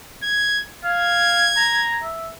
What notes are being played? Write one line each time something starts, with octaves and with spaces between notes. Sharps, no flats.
G#6
F5 G#6
A#5
E5